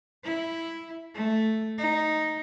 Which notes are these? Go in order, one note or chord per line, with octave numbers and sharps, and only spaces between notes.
E4
A3
D#4